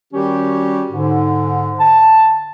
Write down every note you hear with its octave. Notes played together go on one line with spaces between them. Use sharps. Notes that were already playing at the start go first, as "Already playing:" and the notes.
D#3 G3 C#4 F#4 G4
G#2 D3
A5